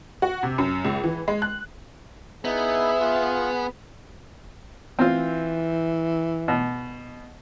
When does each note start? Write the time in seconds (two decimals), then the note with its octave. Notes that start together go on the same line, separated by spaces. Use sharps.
0.22 F#4
0.43 C3
0.58 F#2
0.85 C#2
1.04 E3
1.28 G#3
1.42 F#6
2.45 B3 D#4 E4 G#4 E5
3.00 F4 G#4 F#5
4.99 E3 C4 F4
6.48 B2